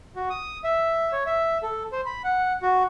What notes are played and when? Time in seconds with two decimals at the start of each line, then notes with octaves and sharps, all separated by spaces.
0.16 F#4
0.30 D#6
0.64 E5
1.12 C#5
1.27 E5
1.63 A4
1.92 C5
2.06 B5
2.24 F#5
2.62 F#4